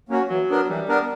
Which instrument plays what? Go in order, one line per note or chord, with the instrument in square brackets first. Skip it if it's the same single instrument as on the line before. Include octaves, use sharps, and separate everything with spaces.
[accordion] F#3 A#3 C#4 F#4
[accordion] E3 [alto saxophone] F#3
[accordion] B3 D4 A#4
[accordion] E3 [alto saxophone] G3
[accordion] B3 D4 A#4